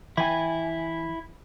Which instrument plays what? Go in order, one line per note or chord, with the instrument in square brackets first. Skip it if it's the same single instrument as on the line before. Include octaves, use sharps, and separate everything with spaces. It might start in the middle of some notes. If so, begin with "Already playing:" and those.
[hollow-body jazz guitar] E3 G5 [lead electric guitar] E4 G#5